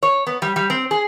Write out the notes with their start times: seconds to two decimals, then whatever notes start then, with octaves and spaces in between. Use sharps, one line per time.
0.03 C#5
0.27 B3
0.42 G3
0.56 G3
0.70 C4
0.91 G#4